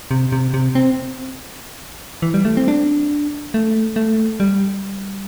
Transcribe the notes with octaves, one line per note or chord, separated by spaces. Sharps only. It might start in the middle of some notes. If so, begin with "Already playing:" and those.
C3
C3
C3
C4
E3
G3
A3
C4
D4
A3
A3
G3